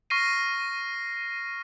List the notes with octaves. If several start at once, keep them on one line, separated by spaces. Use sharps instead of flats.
C#6 F6 A#6 C7 D#7